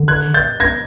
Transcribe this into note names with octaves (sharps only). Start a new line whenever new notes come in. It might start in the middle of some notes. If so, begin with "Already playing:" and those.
Already playing: D3
F#6 G#6
G6 A6
G#6 A#6